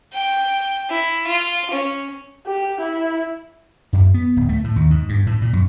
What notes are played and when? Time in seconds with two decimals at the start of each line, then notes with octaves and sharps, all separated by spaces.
0.13 G5
0.90 E4
1.27 F4
1.71 C#4
2.47 G4
2.81 E4
3.93 F#2
4.14 B3
4.36 D1
4.49 A3
4.64 A2
4.76 D#2
4.91 G#2
5.09 G2
5.27 A2
5.42 A#2
5.53 F#2